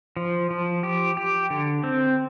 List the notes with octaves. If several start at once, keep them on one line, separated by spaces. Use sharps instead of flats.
F3
F3
G4
G4
D3
C4